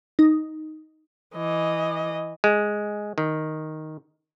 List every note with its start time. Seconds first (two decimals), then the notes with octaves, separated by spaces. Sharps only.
0.19 D#4
1.36 E3 D#5
2.44 G#3
3.18 D#3